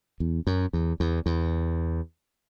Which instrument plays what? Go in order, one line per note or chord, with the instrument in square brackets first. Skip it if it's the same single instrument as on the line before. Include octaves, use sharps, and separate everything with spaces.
[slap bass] E2
F#2
E2
E2
E2